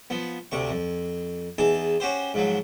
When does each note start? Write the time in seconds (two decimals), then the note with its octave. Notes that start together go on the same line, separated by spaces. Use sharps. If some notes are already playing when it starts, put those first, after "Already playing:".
0.10 F3 B3
0.52 D2 C3 C#6
0.71 F2
1.58 E2 D#4 G#4 A5
2.00 C#4 F#4 G4 C5
2.34 G#2 F3 F#3